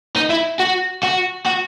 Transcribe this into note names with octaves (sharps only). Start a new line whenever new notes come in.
D#4
E4
F#4
F#4
F#4